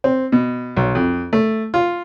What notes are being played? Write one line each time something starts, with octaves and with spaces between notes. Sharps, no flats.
C4
B2
B1
F2
A3
F4